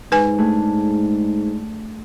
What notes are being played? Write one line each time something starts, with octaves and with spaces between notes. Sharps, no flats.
G#2 B4 G#5
A3 D4 G#4